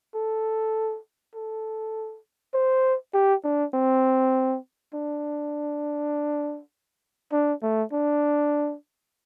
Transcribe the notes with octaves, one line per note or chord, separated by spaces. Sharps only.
A4
A4
C5
G4
D4
C4
D4
D4
A3
D4